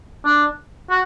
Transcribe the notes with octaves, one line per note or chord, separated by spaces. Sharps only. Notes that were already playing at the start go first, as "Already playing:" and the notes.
D4
F#4